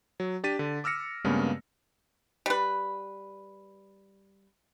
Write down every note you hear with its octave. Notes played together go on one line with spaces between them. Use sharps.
F#3
D4 G4 A6 B6 D#7
D3
D6 E6 F6 A#6 C#7
G2 C#3 G#3 A#3 B3
G3 B4